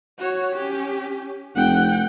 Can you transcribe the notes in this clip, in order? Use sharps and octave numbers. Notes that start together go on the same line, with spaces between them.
F#4 C#5
C#4 G4
F1 F#5 G5